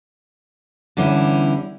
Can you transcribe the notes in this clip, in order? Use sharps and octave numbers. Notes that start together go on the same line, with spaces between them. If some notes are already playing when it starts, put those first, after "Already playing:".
E2 D3 G3 C#4 E4